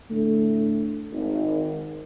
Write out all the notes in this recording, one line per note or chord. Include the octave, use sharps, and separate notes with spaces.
A2 D3 A3
G#1